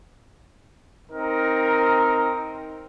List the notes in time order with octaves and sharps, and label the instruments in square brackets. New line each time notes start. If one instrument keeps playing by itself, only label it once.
[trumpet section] C4 D#4 A#4